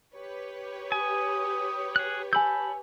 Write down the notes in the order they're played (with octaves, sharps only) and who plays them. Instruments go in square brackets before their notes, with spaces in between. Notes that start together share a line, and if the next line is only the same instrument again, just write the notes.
[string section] G4 B4 C#5
[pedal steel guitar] G#5 [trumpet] D#6
[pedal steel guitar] G#4 F#6
[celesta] G#5 E6 [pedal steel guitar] A5 B5 G6